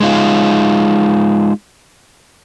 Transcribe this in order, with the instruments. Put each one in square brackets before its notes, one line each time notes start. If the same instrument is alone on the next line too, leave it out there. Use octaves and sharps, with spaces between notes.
[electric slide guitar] G#3 D#4 F4